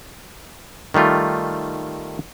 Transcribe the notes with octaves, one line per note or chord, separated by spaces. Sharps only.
D#3 G3 A3 F4